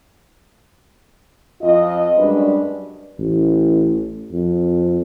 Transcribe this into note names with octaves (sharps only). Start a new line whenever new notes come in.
F2 F4 D#5
F#2 G3 G#3 D4 B4
A1
F2